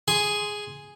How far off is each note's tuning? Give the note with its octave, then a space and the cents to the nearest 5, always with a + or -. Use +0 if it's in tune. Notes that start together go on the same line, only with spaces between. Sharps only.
G#4 +0 C6 +0